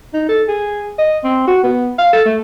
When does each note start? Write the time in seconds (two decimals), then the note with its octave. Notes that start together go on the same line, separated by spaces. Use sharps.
0.14 D#4
0.29 A4
0.48 G#4
0.98 D#5
1.24 C4
1.47 F#4
1.64 B3
1.98 F5
2.13 A4
2.26 A3